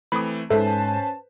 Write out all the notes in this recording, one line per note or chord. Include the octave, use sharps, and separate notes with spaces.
E3 A3 C4 B5 D#6
G#2 C#4 A4 B4 C5 E5 A5